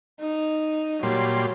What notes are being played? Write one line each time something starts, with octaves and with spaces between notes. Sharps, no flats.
D#4
A#2 F#3 G3 C6